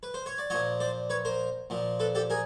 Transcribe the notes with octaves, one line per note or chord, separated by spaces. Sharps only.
B4
C5
C#5
D5
A#2 F3 C#5 D#5
C5 D5
B4 C#5
A#4 C5
A#2 F3
A4 B4
G4 A4
G#4 A#4